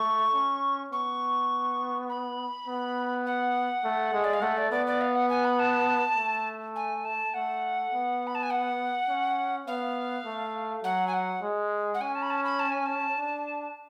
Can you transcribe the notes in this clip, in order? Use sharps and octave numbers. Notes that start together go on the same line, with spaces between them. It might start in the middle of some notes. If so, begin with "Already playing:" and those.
Already playing: A3 C#6
C#4
B3 C#6
B5
B3
F#5
A3
G#3
D5
F5
A3 F#5
D5
B3 D5
D5
F5
F#5
G#5
B5
A5
A3
G#5
A5
A3 F#5
B3
B5
A5
G#5
F#5
C#4
B3 F5
A3
F#3 F#5
G#5
F#5
G#3
F#5
C#4 G#5
A5
B5
A5
B5
A5
G#5
A5
D4